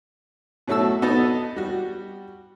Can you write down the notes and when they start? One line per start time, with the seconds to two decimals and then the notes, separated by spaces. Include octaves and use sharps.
0.68 B2 F#3 A3 F#4 E6
1.02 B3 D#4 F#4 A4 D#5 A5
1.56 G3 F#4